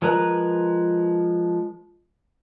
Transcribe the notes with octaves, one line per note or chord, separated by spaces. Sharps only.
F3 G#3 A#4 B4 A#5